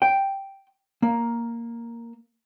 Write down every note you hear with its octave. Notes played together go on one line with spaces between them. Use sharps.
G5
A#3